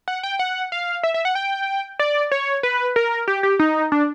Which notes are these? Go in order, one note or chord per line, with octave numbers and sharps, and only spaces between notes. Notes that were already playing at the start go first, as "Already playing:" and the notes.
F#5
G5
F#5
F5
E5
E5
F#5
G5
D5
C#5
B4
A#4
G4
G4
D#4
D4